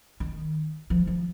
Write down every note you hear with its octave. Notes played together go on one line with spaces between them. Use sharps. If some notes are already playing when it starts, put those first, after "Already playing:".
D#3
F3
F3